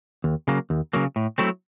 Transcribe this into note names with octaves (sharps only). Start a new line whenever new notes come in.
D#2
C#3 F#3 A#3
D#2
C#3 F#3 A#3
A2
F#3 A3 C4 E4